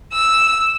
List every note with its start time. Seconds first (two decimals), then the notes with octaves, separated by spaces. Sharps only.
0.12 E6